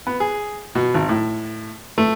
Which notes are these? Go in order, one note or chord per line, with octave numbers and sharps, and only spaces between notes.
B3
G#4
B2
G#1
A2
A3